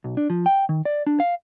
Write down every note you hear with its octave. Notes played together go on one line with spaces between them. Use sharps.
B1
D4
F3
G5
D#3
D5
D4
F5